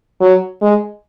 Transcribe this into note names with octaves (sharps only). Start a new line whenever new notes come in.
F#3
G#3